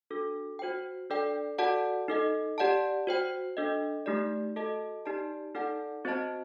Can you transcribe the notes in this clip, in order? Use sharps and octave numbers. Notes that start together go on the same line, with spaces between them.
D4 F#4 A4
F#4 C5 G5
D4 A4 D5 G5
F#4 A4 D5 F#5 A5
D#4 A4 D#5
G4 D5 F#5 A5
F#4 C5 G5
D4 A4 D#5
A3 D#4 G4 D5
F#4 A4 D#5 A5
D#4 G4 D5 A5
D#4 A4 D5 F#5 A5
C4 F#4 C5 D#5 A5